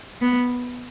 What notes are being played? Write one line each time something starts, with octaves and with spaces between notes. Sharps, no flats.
B3